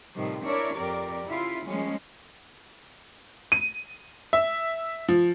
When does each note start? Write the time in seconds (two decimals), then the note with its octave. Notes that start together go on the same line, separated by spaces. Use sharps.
0.16 A2 C3 D#3 F3 G3
0.45 D4 E4 A#4 C#5 D5
0.76 F2 G4 A#4 D5
1.26 C#3 E4 F4
1.66 F3 G3 G#3 A#3 C#4
3.52 D#7
4.33 E5
5.08 F3